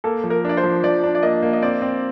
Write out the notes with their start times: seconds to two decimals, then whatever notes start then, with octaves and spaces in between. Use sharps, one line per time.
0.04 A#3 A4
0.24 F3
0.30 A#4
0.45 D4 D5
0.57 C5
0.64 F3
0.83 F3 D5
1.04 D4
1.15 D5
1.23 A#3 D#5
1.42 A#3
1.53 D#5
1.62 C4 D5
1.82 C4